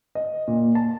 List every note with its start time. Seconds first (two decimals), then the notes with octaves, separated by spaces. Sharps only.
0.15 D#5
0.48 A#2
0.75 A5